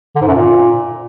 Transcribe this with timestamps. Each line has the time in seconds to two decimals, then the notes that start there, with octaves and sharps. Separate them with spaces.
0.16 D3
0.22 G#2
0.28 F#2
0.34 A#2